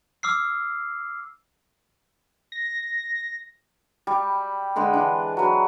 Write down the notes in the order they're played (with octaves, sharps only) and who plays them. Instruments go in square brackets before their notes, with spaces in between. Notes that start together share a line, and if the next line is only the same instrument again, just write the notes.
[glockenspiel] D6 E6 F6 C7
[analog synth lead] A#6
[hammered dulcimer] G3
D3 G#3 B4 C6
E3 D4
F#3 B4